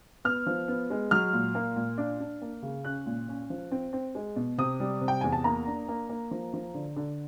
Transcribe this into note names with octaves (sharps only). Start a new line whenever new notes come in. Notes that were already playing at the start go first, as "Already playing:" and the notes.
B3 F6
F3
B3
G#3
F#3 F6
A#2
A#3
A#2
D4
D4
A#3
C#3
C#4 F#6
A#2
C#4
F3
C4
C4
G#3
B2
C3 D#6
G3
C3
G5
E2 G#5
A5
A#3 A#5
D4
A#3
A#3
F3
F3
D3
D3